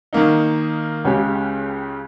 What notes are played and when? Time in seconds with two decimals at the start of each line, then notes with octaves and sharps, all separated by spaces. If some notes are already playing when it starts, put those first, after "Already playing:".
0.13 D#3 A#3 D#4
1.05 C#2 C#3 G#3 C#4 G4